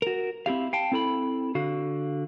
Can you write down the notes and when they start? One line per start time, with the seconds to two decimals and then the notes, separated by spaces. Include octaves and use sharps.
0.02 F#4 A#4
0.46 C4 E4 G4 F5
0.73 F5 G5 A5
0.92 C4 E4 A4 A#5 B5
1.55 D3 F#4 F5